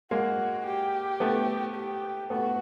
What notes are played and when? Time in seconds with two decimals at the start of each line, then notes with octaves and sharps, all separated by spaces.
0.11 G#3 A#3 F#4
0.67 G4
1.20 A3 B3
1.75 G4
2.30 A3 B3 F#4